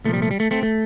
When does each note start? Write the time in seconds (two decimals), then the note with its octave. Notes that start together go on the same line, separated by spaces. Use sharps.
0.05 C2 A#2 F3 A3
0.13 G3
0.22 A3
0.31 G3
0.40 A3
0.51 A3 C4
0.63 A3